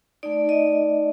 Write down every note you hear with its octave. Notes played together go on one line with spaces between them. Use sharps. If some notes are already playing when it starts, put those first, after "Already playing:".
A3 D#4 D5
D#5